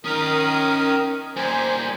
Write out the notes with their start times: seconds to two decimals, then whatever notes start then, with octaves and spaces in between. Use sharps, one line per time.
0.05 D#3 C#4 A#4 A#5 D#6
1.37 G3 A#3 C5 G#5